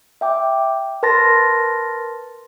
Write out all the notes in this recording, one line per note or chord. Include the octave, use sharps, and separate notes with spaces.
E5 G5 D6
A#4 B4 A5 C6 A6 A#6